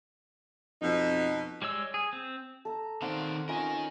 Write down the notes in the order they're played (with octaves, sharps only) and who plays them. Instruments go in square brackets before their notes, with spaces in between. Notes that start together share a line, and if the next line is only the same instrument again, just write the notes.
[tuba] F2 [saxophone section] B2 D#4
[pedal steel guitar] G3 G#3 C#5 E6
G#4
C4
[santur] A4 A#5
[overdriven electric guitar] D#3 D5 [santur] C4 F5 F#5
[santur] C#4 D#4 F4 [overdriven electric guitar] A#4 D#5